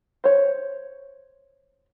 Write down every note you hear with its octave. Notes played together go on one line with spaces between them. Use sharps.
C5 C#5